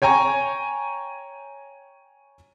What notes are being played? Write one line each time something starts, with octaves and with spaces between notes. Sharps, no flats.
C#5 G5 G#5 A#5 C#6